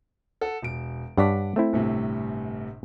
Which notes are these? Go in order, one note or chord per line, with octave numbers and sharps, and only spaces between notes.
A4 F#5
E1 D7
G2 D4 C#5 F#5 D6 B6
A3 C4 E4
G1 A2 C3